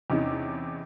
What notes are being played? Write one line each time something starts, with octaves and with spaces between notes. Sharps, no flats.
E2 C3 C#4 D#4 E4